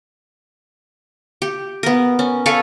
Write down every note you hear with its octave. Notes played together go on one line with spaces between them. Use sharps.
G4
B3 A#4
C#4
A4 B4 C#5 F5